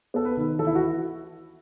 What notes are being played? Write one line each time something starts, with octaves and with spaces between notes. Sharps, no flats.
B3 A4
B4
D#3
E3 A4
E4
F#4